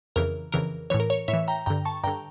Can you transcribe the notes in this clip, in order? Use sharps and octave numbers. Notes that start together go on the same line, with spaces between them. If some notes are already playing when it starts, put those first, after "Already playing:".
F2 C#3 E3 A#4
F2 C#3 E3 A#4
A2 E3 C#5
A#4
C#5
A2 C#5 E5
E3
G5 A#5
G2 D3 G5 A#5
A5 C#6
G2 D3 G5 A#5